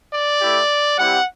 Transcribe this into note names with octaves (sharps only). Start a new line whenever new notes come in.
D5
A3 E4 G4
G3 C4 E4 G4 F#5